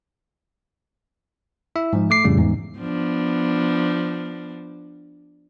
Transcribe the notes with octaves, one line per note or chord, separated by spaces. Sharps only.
E4 E5
G#2 F3
A3 D6 C7
F2 A2 C#3 G3
E2 G#2
F3 B3 D4